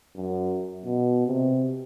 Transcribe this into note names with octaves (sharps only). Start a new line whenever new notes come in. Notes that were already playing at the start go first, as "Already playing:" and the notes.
F#2
B2
C3